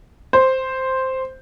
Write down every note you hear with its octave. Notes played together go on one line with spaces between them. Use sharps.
C5